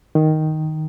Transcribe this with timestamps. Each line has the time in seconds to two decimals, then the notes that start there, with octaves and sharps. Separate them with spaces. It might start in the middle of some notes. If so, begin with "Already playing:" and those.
0.15 D#3